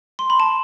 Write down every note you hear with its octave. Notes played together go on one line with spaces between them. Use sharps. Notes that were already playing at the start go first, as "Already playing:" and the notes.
C6
B5
A5